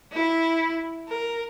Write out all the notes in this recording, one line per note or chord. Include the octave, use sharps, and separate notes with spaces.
E4
A#4